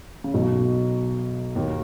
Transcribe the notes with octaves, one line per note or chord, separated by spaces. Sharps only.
C#3
B1 B2
D#2 D#3